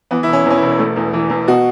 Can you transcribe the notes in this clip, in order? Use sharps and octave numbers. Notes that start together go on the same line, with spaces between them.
E3 B3
E1 E4
C#4
E2 C#4
E4
E1
A3
E2
E3
E2
B2 F#4